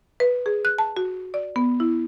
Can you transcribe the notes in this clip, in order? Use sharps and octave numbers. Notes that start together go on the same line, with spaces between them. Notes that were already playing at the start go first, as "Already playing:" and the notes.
B4
G#4
F#6
A5
F#4
D5
B3
E4